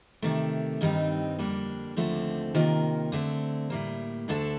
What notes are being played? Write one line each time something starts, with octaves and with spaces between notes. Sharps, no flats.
C3 D#3 A3
G2 D#3 G3 C4 D#4
F2 D3 G3 A#3 D4
D#2 D3 F3 A3 C4
C3 D#3 A#3 F4 A#4
D3 A3 C4
A2 G3 A#3
D2 D3 A3 D4 A4